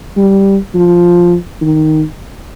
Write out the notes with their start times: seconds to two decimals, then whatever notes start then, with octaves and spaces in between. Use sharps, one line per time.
0.17 G3
0.74 F3
1.61 D#3